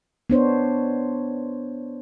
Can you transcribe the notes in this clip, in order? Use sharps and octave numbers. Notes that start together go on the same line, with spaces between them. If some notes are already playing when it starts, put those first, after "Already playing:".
B3 D4 C5 C#5